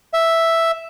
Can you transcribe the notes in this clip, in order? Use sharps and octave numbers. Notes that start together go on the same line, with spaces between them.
E5